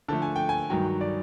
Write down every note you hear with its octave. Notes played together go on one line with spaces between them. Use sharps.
D3 F3 A3 A5
G#5
G5
G#5
G2 D#3 F#3 G5
D5